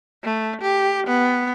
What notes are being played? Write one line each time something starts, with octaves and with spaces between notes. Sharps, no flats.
A3
G4
B3